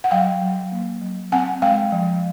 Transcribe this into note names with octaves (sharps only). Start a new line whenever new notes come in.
F#5
F#3 F5 G5
F#3
A#3
F#3
C4 F#5 G#5
G#3 F5 G5
F3